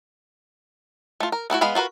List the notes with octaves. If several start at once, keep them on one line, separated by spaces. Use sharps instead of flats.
A3 F4
A#4
A3 B3 E4 F#4
G#3 B3 F5 B5
F4 F#4 A#4 B4